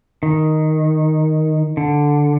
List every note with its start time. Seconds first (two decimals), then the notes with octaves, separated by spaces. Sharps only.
0.23 D#3
1.77 D3